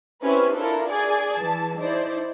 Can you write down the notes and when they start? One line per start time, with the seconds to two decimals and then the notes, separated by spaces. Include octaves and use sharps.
0.22 C4 C#4 E4 G4 B4
0.54 D4 E4 F4 A4 A#4
0.89 G#4 D5 G#5 G#6
1.37 E3 A5
1.78 D#4 E4 C5 D5